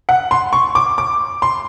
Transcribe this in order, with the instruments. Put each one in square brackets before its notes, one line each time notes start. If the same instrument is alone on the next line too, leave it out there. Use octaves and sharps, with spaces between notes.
[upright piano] F#5
C6
C#6
D6
D6
C6